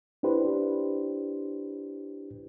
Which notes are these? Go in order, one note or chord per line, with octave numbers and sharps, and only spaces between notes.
D4 E4 G4 B4 C5